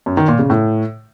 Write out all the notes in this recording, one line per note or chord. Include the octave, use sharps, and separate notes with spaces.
F#2
D#3
A#2
C#3
A2